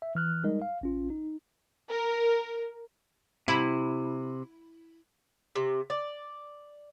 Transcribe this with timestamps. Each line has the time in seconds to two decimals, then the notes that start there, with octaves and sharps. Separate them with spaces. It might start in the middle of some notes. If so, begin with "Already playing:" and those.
0.02 E5
0.15 E3 F6 F#6
0.44 G3 G#3 D#4 A#4 D#5
0.62 F5
0.81 A1 C#4 F4
1.10 D#4
1.90 A#4
3.48 C3 E4
5.56 C3
5.90 D5